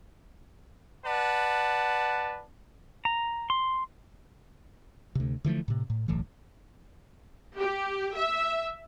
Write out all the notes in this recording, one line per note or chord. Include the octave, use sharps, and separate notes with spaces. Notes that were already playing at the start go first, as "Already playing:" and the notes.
B4 D5 F#5 A5
A#5
C6
D2 C3
D3 E3 F3 A3
A2 C3
A2
D1 B1 A2 E3
G4
E5